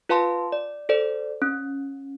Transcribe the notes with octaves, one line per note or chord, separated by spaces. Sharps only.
F4 B4 F5 A5 C6
D5
A4 C5 D5
C#4